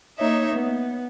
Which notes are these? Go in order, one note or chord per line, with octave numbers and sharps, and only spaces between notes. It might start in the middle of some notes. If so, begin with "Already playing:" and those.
A#3 D#4 C#5 E5
B3